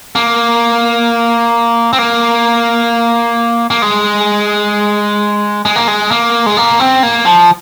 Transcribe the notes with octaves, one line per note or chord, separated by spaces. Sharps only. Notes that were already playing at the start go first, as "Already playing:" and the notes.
A#3
C4
A#3
A#3
G#3
G#3
A#3
G#3
A#3
G#3
A#3
C4
A#3
F3